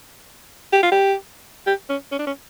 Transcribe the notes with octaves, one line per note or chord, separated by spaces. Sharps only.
G4
F4
G4
G4
C#4
C#4
D4
C#4